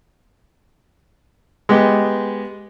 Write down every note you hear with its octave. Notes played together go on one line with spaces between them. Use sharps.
G#3 B3 G4 D#5